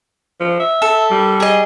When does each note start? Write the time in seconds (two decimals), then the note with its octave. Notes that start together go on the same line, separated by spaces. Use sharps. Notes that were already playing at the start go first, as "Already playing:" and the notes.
0.40 F3
0.60 E5
0.82 A4
1.11 G3
1.40 G#4 D#5